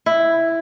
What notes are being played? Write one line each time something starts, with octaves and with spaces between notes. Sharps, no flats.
E4